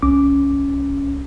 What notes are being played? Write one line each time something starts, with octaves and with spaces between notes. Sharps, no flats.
C2 C#4 D6